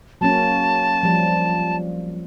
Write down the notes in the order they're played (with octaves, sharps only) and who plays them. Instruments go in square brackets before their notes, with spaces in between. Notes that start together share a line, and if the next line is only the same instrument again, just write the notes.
[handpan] F#3 A#3 C#4 [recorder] A5
[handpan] F3 G3